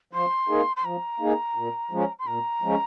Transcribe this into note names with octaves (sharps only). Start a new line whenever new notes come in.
F3 C6
A#3 D#4 G#4
C6
F3 A#5
A#3 D#4 G#4
A#2
F3 G#3 C#4
C6
A#2 A#5
F3 G#3 C#4